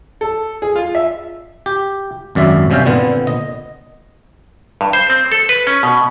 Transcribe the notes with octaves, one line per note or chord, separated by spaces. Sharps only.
A4
G#4
F4
E5
G4
G#1 F#2 D5 E5
G1 C3 C#4 E5 F5 G5
A#2 D3 B3 C4
D#5
G2
C5
C4
A4
B4
C#4
B2